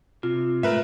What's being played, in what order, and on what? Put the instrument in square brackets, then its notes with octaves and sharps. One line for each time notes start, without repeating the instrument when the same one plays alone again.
[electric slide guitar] C3 [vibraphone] F4
[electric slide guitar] G#2 A3 [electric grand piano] A#4 B4 E5